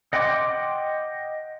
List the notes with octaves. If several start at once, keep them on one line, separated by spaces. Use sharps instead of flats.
D#5 F#5 G5 C6 D6